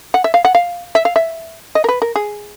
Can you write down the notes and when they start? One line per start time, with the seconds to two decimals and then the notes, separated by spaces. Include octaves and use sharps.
0.14 F#5
0.24 E5
0.34 F5
0.45 F#5
0.55 F5
0.95 E5
1.05 F5
1.16 E5
1.75 D#5
1.84 A#4
1.89 B4
2.02 A#4
2.16 G#4